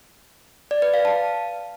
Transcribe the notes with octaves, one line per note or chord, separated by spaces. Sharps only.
D5
B4
F5
A5